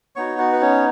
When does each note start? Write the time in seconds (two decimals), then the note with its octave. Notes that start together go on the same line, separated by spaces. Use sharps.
0.16 B3 D#4 F#4 C#5 C#6
0.38 F#4 F#5
0.52 B4
0.61 C#4 C#5